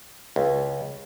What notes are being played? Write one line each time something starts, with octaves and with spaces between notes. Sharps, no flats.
C#2